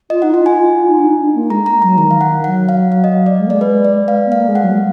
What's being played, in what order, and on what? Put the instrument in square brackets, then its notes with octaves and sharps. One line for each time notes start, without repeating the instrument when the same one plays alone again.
[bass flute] F4 [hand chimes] D#5
[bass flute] D#4 [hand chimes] F#5
[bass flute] F4 [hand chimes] F#5
[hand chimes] G#5
[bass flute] F4
F4
D#4
D4
D#4
D4
A#3
[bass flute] G#3 [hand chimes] A#5
[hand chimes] A#5
[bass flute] F#3 [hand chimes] A#5
[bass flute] D#3 [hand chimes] A#5
[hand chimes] F5
F#5
[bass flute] F#3 [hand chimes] F#5
[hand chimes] F5
F5
D#5
D5
[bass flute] G#3
A#3
[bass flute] G#3 [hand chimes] D5
[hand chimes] B4
D5
F5
[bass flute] B3
[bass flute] A#3 [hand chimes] F5
[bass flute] G#3
[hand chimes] F#5
[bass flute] F#3
G#3